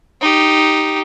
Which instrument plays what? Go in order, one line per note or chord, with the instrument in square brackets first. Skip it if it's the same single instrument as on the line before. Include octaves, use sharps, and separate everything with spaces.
[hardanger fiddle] D#4 G4